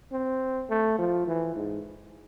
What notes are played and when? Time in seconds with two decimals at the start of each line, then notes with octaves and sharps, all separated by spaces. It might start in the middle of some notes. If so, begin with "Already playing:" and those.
0.12 C4
0.70 A3
0.98 F3
1.27 E3
1.56 G#2